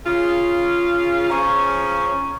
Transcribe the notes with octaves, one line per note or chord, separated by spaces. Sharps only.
C#3 F4
C#3 F3 C#4 A#5 C#6